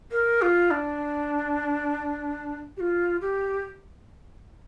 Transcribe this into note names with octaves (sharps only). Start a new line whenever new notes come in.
A#4
F4
D4
G4
F4
G4